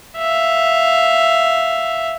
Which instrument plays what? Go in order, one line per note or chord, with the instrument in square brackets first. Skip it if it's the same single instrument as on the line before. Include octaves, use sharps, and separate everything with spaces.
[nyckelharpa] E5 F5